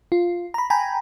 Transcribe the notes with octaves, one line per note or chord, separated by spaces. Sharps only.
F4
A#5 B5
G5 G#5 A#5 B5